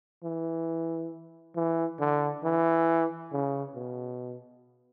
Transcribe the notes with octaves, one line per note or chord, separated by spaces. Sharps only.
E3
E3
D3
E3
C#3
B2